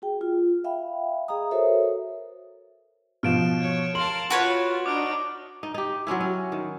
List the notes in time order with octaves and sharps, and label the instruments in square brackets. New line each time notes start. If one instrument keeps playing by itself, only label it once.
[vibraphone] F#4 G#4 G5
F4
E5 F5 G5 B5
G#4 D#5 F5 A#5 D#6
F#4 A4 A#4 C5 C#5 E5
[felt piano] B2 F3 [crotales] F6 D7 E7
[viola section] C#5
[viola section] A#4 F5 A5 [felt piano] C6 [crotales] F#7
[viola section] F4 [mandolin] F#4 B4 C#5
[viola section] D4 D#4 [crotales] D6 F6 D7
[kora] D#4
D#4 G4
F#3 C4 C#4 E4
C#4
D#3